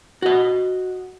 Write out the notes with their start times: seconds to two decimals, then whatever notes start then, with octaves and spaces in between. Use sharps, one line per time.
0.22 F#4 D#5